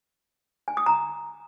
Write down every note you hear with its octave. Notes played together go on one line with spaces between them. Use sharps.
G#5
D#6
A#5